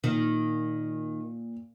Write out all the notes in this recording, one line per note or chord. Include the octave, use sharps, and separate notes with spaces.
A#2 D#3